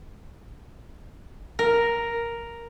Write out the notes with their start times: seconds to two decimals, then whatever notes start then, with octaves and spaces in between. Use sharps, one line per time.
1.59 A#4